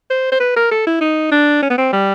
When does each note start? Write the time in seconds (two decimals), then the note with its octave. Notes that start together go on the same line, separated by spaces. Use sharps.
0.10 C5
0.32 C5
0.40 B4
0.56 A#4
0.71 A4
0.87 E4
1.01 D#4
1.32 D4
1.62 C#4
1.70 B3
1.78 C4
1.93 G3